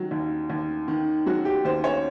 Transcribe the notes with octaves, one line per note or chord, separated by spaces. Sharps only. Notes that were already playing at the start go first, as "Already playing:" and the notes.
Already playing: D#3 F#3
D#2
D#2
D#3
F#3 F#4
G4
D#2 C5
C#5